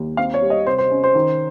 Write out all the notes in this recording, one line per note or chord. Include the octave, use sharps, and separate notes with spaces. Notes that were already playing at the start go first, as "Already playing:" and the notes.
Already playing: D#2 D#3
C4 F5
C#5
G3
D#5
C3 C5
C5
C#4
C5
D#3